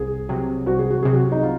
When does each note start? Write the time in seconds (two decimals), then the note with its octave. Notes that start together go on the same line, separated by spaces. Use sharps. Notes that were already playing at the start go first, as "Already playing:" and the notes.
Already playing: C2 G#4
0.29 C3 F#3
0.66 C2 F#4
0.79 G#4
0.90 F#4
1.03 C3 F#3 G#4
1.14 F#4
1.32 D#4
1.43 F4